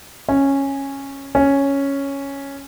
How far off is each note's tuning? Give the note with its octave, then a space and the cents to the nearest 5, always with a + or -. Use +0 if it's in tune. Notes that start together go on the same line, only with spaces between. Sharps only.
C#4 -10
C#4 +0